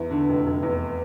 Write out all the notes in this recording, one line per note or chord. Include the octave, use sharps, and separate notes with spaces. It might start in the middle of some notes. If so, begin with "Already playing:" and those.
Already playing: E2 E4
D3
F1
F1
E2